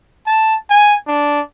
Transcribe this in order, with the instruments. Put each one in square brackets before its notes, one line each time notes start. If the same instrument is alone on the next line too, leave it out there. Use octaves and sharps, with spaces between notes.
[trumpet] A5
G#5
D4